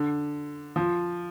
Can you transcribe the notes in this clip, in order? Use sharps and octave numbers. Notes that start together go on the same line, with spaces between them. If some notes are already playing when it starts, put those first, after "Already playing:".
Already playing: D3
F3